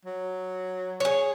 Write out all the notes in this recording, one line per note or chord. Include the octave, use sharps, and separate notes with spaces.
F#3
G#4 C#5